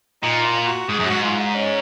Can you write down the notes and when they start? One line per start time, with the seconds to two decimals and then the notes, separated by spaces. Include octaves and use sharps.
0.22 A#2 D#4
0.45 F4
0.67 F#4
0.89 G#2 G#4
0.99 F#2
1.06 G#2 F#4
1.22 F4
1.39 D#4
1.55 C#4